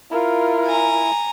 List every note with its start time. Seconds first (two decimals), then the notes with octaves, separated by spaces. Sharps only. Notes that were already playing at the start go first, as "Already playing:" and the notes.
0.11 E4 F4 A#4
0.66 G#5 A#5